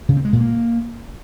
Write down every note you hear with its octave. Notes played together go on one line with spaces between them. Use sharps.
C#3
C4
G#3
A#2
A#3